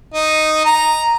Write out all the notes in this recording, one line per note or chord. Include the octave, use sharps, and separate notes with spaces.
D#4
A#5